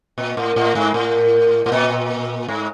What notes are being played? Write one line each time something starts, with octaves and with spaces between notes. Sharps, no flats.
A#2
A2
A2
G#2
A2
A2
A#2
G#2